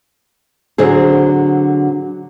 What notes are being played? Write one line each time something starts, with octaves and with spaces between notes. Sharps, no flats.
D3 F#3 C4 G#4